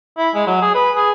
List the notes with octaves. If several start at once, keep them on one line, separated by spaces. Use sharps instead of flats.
E4
G#3
F#3
G#4
B4
G#4